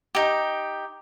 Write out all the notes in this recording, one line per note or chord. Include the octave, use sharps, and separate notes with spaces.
D#4 G4